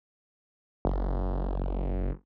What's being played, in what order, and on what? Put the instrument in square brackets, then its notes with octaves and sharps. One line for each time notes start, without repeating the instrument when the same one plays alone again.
[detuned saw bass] F#1